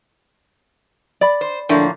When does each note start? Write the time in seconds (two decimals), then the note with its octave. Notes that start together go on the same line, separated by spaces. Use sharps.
1.21 D5 B5
1.41 C5
1.69 A2 D3 F3 A#3